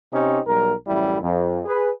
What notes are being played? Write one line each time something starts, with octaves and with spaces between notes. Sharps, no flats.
C3 C#4 D#4 G4 C5
B1 G3 A#4
A1 F#2 G3 E4
F2
G#4 B4